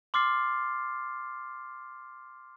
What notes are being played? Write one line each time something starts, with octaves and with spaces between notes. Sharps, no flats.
C6 D6 F6 A6 C7